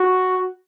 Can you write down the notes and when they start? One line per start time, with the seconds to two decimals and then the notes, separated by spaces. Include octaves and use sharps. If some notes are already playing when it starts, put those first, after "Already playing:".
Already playing: F#4